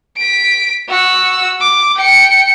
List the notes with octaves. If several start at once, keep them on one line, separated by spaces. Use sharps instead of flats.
B6 D7
F#4 E6
D6
G5 C#7